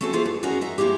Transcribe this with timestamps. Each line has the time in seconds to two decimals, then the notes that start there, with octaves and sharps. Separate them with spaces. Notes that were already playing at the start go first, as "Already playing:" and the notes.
0.01 A3 C4 C#4 F#4 A4
0.13 A#3 E4 F4 G#4 C5
0.26 G2
0.43 C#4 D#4 F#4 G#4 A#4 C#5
0.61 D#5 E5 A#5
0.78 G3 G#3 A#3 E4 G4